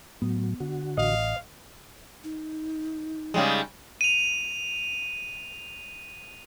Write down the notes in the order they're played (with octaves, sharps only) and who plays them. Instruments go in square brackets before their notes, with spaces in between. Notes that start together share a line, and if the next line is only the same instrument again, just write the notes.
[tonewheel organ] A2 F#3 [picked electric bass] B3
[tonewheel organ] D3 F#4
[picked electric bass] A1 [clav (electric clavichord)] D#5 [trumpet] F5
[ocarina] D#4
[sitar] C#3 G3 G#3
[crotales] D#7 F7